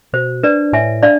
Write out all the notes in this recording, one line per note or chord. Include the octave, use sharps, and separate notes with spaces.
B2 C5
D4 B4 D5
A2 E5 G#5
D4 D5 F5